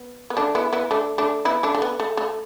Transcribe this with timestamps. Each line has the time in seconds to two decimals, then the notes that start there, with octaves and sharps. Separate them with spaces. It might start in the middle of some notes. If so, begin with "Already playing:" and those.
Already playing: B3
0.30 B3
0.37 A3 D4
0.55 B3 E4
0.73 B3 E4
0.91 A3 D4
1.18 A3 D4
1.45 B3 E4
1.63 A3 D4
1.75 A3
1.82 B3
2.00 A3
2.17 A3